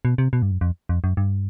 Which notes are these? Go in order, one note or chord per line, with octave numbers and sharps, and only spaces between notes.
B2
C3
B2
G2
F#2
F2
F2
F#2
G2